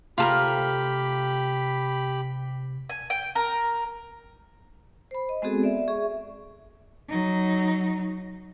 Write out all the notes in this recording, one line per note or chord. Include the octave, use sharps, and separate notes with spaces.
C3 A3 F4 G4 A4 A#4 B5
G#5
G5
A#4
C5 B5
D#5
G#3 B3 C4 F#4 G#4 A4
D5 E5
G#4 E5 C#6
F#3 D#4